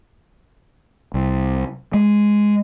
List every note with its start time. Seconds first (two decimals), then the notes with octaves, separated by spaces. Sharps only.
1.14 C2
1.94 G#3